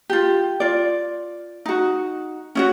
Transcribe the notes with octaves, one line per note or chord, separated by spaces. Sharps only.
F4 G4
F4 D5
D#4 F#4
C#4 E4 F#4